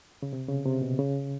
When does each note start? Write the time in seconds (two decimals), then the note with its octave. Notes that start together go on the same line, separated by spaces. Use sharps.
0.22 C#3
0.33 C3
0.48 C#3
0.66 C3
0.82 B2
0.99 C#3